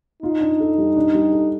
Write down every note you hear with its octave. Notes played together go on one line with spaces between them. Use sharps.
D#4 F4
D4
A4
G3
D4
G3
A4